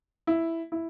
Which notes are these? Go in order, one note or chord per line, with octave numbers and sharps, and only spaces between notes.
E4
E4